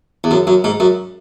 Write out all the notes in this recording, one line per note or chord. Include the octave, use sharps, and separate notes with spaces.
E2
F#2
F#2
G#2
F#2